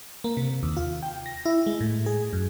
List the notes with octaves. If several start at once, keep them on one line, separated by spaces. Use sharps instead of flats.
A#3
C3
D#2
F4
G5
A#6
E4
G#3
A2
G#4
F#2